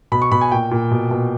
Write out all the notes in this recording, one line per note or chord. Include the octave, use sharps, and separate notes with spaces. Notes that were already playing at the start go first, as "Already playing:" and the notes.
B2 B5
C#6
B2 B5
G#5
A#2 G5
A#2
B2
B2